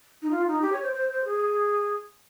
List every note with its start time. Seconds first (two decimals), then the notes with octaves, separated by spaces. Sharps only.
0.22 D#4
0.31 F4
0.47 D#4
0.62 G4
0.72 C#5
0.83 C5
0.93 C5
1.09 C5
1.25 G#4